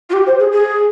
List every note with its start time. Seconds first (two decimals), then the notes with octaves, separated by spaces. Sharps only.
0.10 F4
0.13 G4
0.27 C5
0.39 G#4
0.52 G#4